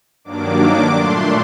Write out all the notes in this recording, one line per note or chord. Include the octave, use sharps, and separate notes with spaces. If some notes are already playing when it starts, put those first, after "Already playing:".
G2 D#3 F#3 A#3 D4 D6
A#2 A3 D4 C6